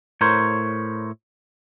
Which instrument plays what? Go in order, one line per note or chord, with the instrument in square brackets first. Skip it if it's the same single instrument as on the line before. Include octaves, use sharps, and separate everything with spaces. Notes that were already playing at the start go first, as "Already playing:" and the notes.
[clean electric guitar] A2 A#4 C5 C#5